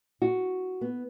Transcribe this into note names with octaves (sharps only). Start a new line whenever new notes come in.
F#4
B3